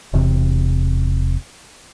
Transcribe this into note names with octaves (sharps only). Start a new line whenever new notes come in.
E1 E2 C3